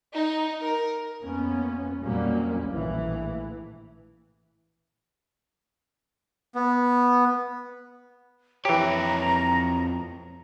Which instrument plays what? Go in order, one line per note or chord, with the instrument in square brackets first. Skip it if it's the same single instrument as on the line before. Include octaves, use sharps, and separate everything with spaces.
[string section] D#4
A#4
[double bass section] F2 A#3 B3 C#4
F2 A#2 F#3 G3 A#3 C#4
A#1 A2 E3
[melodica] B3
[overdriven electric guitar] F2 C#5 [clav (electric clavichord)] E3 G4 [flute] A#5